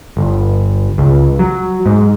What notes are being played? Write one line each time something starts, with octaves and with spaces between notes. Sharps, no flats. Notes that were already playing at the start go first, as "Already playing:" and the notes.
G1
C#2
F#3
G#2